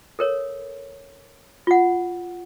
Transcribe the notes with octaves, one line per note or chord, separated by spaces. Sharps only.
A4 A#4 C#5
F4 F#5